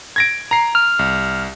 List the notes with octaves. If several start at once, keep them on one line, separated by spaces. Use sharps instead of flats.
G#6 A#6 D7
A#5 C7
F6
C2